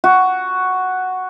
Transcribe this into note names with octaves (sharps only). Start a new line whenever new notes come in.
F#4